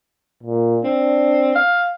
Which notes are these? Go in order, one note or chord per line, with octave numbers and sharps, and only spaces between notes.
A#2
C4 D4
F5